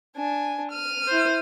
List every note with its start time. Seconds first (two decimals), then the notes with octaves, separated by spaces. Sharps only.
0.17 D4 G#5
0.71 F6 D#7
1.07 E4 C5